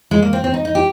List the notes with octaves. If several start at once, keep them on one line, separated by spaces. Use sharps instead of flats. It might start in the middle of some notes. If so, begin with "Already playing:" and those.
G#3
A#3
C4
C4
D#4
D#4
G4